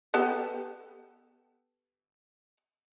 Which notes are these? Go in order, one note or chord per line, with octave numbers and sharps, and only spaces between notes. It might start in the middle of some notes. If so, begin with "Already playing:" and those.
B3 G4 A4